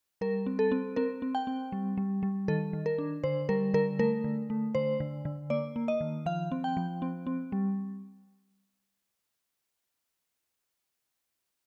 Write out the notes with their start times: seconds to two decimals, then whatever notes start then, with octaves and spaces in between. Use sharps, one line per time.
0.21 G3 A#4
0.46 C4
0.59 A4
0.72 C4
0.96 C4 A#4
1.22 C4
1.35 G5
1.47 C4
1.72 G3
1.98 G3
2.23 G3
2.48 D#3 A4
2.73 D#3
2.86 A#4
2.98 D4
3.24 D3 C5
3.49 G3 A#4
3.74 D3 A#4
3.99 A3 A#4
4.24 D3
4.50 A3
4.75 D3 C5
5.00 D3
5.25 D3
5.50 A#3 D5
5.76 A#3
5.88 D#5
6.01 D#3
6.26 F3 F5
6.52 C4
6.64 G5
6.77 F3
7.02 C4
7.27 C4
7.52 G3